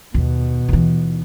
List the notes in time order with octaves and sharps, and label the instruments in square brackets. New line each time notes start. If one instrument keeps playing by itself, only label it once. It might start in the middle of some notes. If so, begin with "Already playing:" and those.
[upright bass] D#2 [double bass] B2
[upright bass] D#2 E3